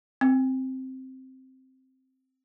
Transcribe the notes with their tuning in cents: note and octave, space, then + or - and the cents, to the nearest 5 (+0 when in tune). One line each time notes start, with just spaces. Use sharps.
C4 +0